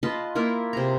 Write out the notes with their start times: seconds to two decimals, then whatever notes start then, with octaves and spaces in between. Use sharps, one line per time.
0.03 F4 B4 D#5 A5
0.35 A#3 E4 F4 A#4
0.73 C3 G#4 A#5